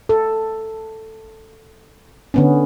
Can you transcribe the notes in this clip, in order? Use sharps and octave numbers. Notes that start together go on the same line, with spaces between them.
A4
D3 B3 C#4